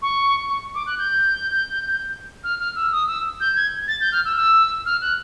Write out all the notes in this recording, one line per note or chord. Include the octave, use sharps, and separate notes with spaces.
C#6
C#6
D6
F#6
G6
F6
F6
E6
D#6
E6
G6
G#6
A6
G6
F6
E6
E6
F6
F#6